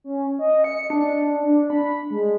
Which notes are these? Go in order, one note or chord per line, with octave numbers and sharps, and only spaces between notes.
C#4
D#5
C#7
D4
D4
B5
G#3